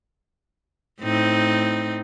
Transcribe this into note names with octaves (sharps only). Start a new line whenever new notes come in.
A2 C4 D#4